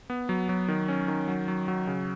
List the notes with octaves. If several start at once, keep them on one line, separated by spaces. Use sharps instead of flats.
B3
F#3
F#3
D#3
C#4
D#3
F#3
F#3
F#3
C#3